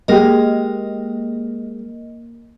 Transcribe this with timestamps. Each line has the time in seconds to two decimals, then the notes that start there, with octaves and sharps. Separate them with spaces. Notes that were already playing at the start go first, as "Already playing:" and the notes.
0.08 G#3 A#3 G4 A#4 D#5